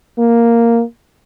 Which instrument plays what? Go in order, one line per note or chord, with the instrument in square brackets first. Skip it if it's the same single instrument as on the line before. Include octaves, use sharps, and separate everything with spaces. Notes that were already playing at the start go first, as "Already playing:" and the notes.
[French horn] A#3